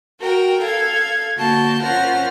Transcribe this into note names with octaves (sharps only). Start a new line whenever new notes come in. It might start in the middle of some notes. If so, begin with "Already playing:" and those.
F#4 A#4 G5
A4 F5 G#6
D3 A#3 F#4 A5 G6
C#4 F4 A#4 C5 F#5 F6